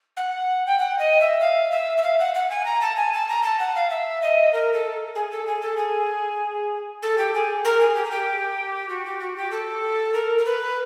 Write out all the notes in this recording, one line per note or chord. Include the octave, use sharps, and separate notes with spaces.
F#5
G5
F#5
D#5
E5
F5
E5
E5
F5
F#5
F#5
G#5
A#5
A5
G#5
A5
A#5
A5
F#5
F5
E5
D#5
A#4
A4
G#4
A4
G#4
A4
G#4
A4
G4
G#4
A#4
G#4
G4
G#4
G4
F#4
G4
F#4
G4
A4
A#4
A#4
B4